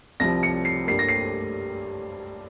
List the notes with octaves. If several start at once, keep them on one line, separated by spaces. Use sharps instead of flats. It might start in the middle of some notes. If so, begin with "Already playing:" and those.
C2 C3 F3 A#6
C#7
C7
G2 G3 A#3 C7
A#6
C7